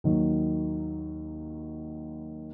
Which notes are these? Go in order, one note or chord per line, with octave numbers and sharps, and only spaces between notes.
D#2 D#3 F#3